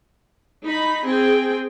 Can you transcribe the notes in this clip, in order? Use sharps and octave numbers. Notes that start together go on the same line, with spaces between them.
D#4 B5
C4 G#4 G5